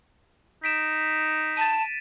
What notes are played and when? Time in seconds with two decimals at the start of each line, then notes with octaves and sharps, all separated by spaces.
0.64 D#4 B6 D7 E7
1.57 A5 A6 D#7